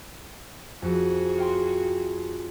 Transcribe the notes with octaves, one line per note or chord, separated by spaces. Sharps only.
F2 F#4 G#4
F5 G5 C6